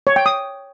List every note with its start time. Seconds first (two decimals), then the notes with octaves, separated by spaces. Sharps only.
0.07 C#5
0.16 G5
0.26 D#6